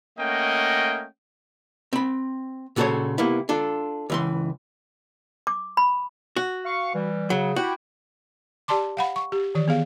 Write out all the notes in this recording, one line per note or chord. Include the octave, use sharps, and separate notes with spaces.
A3 A#3 C#4 D#5 F#5 G5
C4 B5
A#2 C#3 F#4 A4 C5 C#5
C3 A#3 B3 E4
D4 F4 A4
C#2 E3 C6
D6
B5
F#4
F5 C#6
E3 G3
C#3 F#3
E4 F#4 G4 G5
G4 D5 A5 C6 D6
F5 F#5 B5
C#6
G4
D#3 E3 D5
B3 G#4 F5